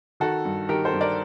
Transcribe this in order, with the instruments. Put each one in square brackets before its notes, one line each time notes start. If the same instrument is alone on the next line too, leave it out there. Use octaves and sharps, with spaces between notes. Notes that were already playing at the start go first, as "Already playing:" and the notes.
[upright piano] D#3 F#4 A4
G2
D#3 G4 A#4
A4 C5
G2
A#4 D5